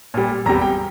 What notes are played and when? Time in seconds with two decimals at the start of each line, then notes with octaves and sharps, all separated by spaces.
0.14 A#2 G3
0.46 E2 C3 G3 A#5
0.61 G5